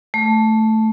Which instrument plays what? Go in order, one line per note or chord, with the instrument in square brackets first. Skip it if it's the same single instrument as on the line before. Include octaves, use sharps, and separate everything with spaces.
[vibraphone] A3